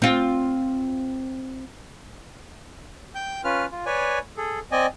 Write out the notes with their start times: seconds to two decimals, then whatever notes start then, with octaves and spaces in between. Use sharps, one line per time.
0.02 C4 F4
3.15 G5 G6
3.44 C#4 F4 B4 F6
3.72 F4
3.86 B4 C#5 D5 G#5
4.37 G#4 A4
4.72 C4 D5 D#5 G#5